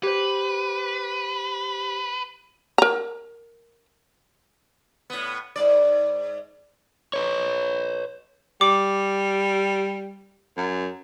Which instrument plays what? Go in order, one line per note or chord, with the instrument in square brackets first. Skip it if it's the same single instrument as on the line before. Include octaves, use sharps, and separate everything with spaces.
[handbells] G4 C5 [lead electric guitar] B4
[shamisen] A#4 A#5
[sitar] A2 B3
G#2 D5
[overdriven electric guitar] B4 C#5
[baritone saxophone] G3 [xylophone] D6
[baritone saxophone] F#2